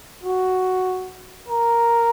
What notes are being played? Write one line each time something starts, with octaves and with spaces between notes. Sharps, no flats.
F#4
A#4